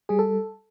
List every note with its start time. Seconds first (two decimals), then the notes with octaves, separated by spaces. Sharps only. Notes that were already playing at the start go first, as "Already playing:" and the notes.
0.09 G3 G#4
0.19 A4